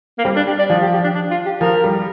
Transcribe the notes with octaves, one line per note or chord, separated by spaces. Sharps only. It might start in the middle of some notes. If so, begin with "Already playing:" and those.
A#3
G3 C4
D4
G4
D5
F3
G4
G4
D4
D4
F4
G4
F3 A#4
G3